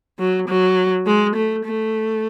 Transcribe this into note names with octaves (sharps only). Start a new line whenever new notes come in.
F#3
F#3
G#3
A3
A3